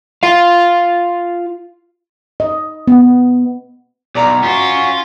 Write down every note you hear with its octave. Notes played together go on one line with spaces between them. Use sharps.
F4 F5
D#5
B3
B1 D5 A#5 D6
C#4 F4 F#4